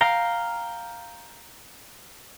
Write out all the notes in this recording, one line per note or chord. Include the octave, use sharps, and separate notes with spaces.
F5 G5 A#5